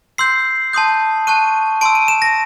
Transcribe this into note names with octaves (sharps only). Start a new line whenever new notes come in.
C6 E6 G6 C7
A5 C6 D#6 G6
A5 C#6 F#6 D#7
A5 C6 E6 D7
D#7
E7
A#6